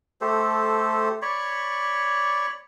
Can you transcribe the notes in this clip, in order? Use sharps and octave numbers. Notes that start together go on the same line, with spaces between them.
A3 G4 A4 C5
C#5 D5 B5 C#6